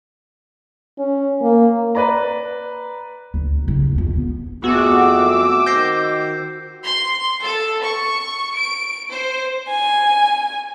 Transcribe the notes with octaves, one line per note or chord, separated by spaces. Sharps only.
C#4
A#3
B4 D5 A#5
D2
C#3 E4
D2
E1 F2
B3
F2 A3 B3 F#4 G#4 D6 E6
D#3 C5 G6 A#6 C7
C6
A4
C#6
D7
C5
G#5